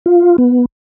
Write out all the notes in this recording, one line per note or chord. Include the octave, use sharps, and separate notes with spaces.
F4
B3